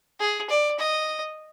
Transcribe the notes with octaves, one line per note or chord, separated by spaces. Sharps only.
G#4
D5
D#5